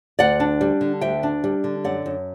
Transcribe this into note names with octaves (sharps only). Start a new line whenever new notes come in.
D2 D5 F#5
D4
G3
D3
D2 E5 G5
D4
G3
D3
F#2 D5 F#5
F#2